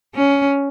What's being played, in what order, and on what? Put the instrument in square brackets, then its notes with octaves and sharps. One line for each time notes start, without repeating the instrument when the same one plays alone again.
[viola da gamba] C#4